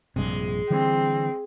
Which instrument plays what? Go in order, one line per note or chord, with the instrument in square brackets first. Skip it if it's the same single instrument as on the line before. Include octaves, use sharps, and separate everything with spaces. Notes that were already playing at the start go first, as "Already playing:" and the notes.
[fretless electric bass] A#1 G2 C3 [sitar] G#3
[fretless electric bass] D3 E3 G3 [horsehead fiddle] C4